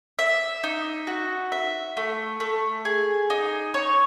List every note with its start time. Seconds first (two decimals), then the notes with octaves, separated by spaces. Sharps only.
0.19 E5
0.64 D#4
1.07 F#4
1.52 E5
1.97 A3
2.40 A3
2.85 G#4
3.30 D#4
3.74 C#5